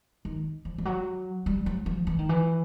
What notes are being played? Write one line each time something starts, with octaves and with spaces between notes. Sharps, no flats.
D#3
F3
F3
F#3
G3
F#3
F3
E3
D#3
E3